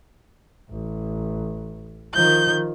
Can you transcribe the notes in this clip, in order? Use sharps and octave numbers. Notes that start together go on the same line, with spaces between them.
A1
D#3 F3 G6